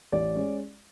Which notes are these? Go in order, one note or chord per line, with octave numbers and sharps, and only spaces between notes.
A1 D5
G#3 C#4